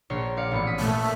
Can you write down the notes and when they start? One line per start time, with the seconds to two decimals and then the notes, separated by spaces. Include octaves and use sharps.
0.10 A#1 C#5 C6
0.37 D5 F5 C#7
0.51 A1 B3 C#7
0.67 D#6 B6
0.79 A#2 A3